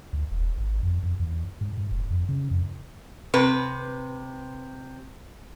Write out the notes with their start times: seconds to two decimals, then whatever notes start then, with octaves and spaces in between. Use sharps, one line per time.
0.13 D2
0.31 E1
0.57 G#1
0.83 F2
1.03 F2
1.20 E2
1.61 G#2
1.77 G#2
1.91 F1
2.11 F2
2.29 C#3
2.51 F2
3.34 C3 B4